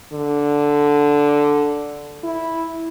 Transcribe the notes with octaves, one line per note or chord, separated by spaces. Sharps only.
D3
E4